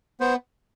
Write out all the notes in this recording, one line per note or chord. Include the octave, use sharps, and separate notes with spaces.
B3 C5